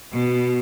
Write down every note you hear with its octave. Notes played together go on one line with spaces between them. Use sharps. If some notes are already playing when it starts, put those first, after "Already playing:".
B2